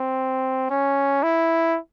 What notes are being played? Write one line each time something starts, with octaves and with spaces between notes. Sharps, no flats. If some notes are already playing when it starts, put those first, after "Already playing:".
Already playing: C4
C#4
E4